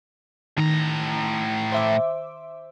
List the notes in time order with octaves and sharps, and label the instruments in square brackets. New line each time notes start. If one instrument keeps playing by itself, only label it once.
[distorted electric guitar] A2 A#5 [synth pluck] D#3
[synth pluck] C5 E5 D6